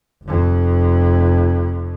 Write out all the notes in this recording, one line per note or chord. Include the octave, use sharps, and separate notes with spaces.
F1 F2